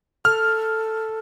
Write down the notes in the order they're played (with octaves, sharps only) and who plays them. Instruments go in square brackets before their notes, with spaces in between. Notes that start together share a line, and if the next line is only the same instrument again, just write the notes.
[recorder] A4 [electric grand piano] F6